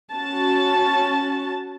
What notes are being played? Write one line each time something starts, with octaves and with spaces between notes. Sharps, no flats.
C#4 F#4 A5